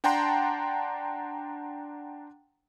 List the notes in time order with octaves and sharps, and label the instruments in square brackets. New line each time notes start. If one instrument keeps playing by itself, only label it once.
[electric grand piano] D4 F#5 G5 A5 A#5 C6